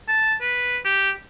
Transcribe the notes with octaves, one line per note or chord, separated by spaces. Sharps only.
A5
B4
G4